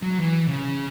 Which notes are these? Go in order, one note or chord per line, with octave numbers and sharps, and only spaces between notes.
F#3
E3
C#3